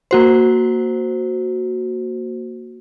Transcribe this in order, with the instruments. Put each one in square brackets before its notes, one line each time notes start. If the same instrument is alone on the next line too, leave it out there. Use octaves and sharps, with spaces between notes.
[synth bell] A#3 F#4 C5